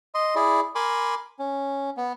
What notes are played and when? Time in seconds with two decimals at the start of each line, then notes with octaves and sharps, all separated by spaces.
0.15 D#5 C6
0.36 E4 G#4 D5
0.75 A#4 G#5 B5 C6 D6
1.39 C#4
1.97 B3